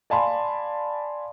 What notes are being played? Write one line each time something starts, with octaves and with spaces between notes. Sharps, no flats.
D5 F5 G#5 A5 B5 C6